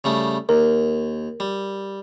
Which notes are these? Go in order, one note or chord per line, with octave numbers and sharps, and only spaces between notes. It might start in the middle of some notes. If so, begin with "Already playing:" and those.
C#3 G3 A3
D#2 A#4
G3